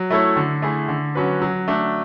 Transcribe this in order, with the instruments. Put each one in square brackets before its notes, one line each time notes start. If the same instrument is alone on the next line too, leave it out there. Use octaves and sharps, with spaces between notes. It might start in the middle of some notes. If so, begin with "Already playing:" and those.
Already playing: [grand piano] F#3
A3 E4 A4 C#5
D3
A3 E4 G#4
D3
F#3 C#4 F#4 B4
F#3
A3 D4